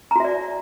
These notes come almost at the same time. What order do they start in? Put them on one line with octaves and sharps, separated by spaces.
A#5 F#4 E5 D5